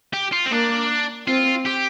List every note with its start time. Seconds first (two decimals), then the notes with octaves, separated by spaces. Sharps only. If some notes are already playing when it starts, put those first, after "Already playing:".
0.14 G4
0.33 F4
0.46 C4
0.51 A#3 D4
1.27 C4 F4
1.65 G4